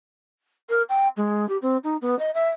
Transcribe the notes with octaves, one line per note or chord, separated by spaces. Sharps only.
A#4
G5
G#3
G4
C4
D#4
B3
D#5
E5